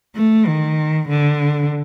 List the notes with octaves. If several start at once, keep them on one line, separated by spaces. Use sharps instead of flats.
A3
D#3
D3